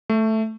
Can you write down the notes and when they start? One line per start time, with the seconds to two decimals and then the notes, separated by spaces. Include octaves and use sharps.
0.09 A3